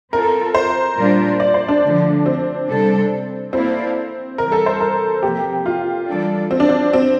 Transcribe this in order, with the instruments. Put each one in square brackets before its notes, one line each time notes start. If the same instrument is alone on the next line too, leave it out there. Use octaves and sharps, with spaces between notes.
[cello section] C4 F4 A4 [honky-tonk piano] A#4
[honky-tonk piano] C5
[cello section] A#2 G3 D4 F4 A#4
[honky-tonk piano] D5
C5
D4
[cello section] D3 F3 A3
[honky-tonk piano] C4
[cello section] C3 G3 D4 A4
[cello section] A#3 E4 A4 D5 F5 [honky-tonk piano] C4
[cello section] C3 E3 G3 [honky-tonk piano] A#4
[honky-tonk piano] A4
C5
A#4
[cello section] C3 F3 A#3 [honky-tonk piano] G4
[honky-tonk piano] F4
[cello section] E3 G3 D4 A4 D5
[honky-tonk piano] C4
D4
C4
C4